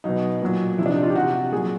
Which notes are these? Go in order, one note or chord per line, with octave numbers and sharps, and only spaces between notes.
B2 F#3 D#4
A#2 F#3
C3 F3 E4
D4
D#4
F4
G4
C3 F3 F#4
A#2 F#3 G#4